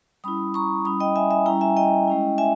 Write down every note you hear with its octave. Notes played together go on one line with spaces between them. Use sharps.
G3 C#4 E4 B5 D#6
A#5 C#6
G3 C#4 E4 B5 D#6
D#5 G5
E5 G#5
E5 G#5
G3 C#4 E4 G5 A#5
E5 G#5
D#5 G5
G#3 C#4 E4
E5 G#5